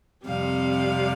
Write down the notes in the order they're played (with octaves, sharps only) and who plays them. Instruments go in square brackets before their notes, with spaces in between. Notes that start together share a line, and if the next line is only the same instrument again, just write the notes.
[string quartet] F2 C3 G3 F5